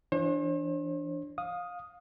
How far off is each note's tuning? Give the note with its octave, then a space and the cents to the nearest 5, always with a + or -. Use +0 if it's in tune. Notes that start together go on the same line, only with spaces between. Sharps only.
E3 +20 D4 +0 C5 +45
F5 +25 D#6 +0